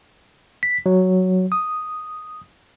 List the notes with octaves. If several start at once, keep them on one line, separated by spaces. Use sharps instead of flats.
B6
F#3
D#6